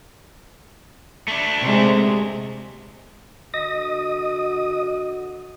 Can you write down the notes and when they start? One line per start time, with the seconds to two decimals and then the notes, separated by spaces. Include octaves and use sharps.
1.28 A3 D4
1.62 C3 G#3
3.54 D3 F#4 D#5 D#6